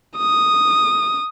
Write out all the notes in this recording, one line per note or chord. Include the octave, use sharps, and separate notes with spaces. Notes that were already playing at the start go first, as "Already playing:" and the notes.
D#6